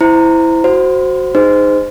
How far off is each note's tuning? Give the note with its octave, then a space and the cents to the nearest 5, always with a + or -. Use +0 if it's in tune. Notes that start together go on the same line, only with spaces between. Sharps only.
E4 +0 C5 -20 A#5 -15
F#4 +5 C5 +0
D#4 -15 G#4 -25 C5 -20